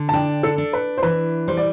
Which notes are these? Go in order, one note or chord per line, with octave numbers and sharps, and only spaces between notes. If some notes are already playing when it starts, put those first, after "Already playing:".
Already playing: D3
A5
D4 G5
A4
D4
B4
C5
E3 B4
G3 C5
D5